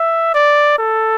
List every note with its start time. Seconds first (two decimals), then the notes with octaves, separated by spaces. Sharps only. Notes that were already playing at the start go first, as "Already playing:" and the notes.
Already playing: E5
0.34 D5
0.79 A4